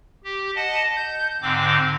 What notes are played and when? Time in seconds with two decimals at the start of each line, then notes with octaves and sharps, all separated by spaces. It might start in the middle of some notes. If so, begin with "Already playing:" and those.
0.24 G4
0.56 D#5 F#5 A5
0.97 G6
1.42 G#2 D3 C4 D6